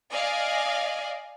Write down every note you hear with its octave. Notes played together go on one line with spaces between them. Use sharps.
D5 D#5 F5 G#5